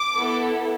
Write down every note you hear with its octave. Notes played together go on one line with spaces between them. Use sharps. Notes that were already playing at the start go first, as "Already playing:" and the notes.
Already playing: D6
B3 E4 A4